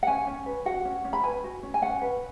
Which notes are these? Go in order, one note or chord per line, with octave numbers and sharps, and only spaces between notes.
F#5
C#4 G#5
C#4
B4
F#4 F#5
C#4
C#4
B5
B4 G#5
F#4
C#4
G#5
C#4 F#5
B4